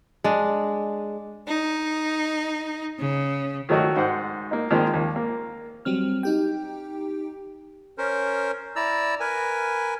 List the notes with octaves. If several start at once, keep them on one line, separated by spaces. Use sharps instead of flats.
G#3 D4
D#4
C#3
D#3 F#3 A3 D#4 F#4
G#2 C5 F#5
A#3 D#4
D#3 F3 G#3 A#3 C4 D#4
D#2
A#3
F#3 G3 C4 F6
D#4 G4 G5
C#4 A#4 C5
E4 D5 A#5 E6
A#4 B4 G#5